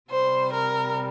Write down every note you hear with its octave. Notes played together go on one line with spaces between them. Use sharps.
C3 G3 C5
A#4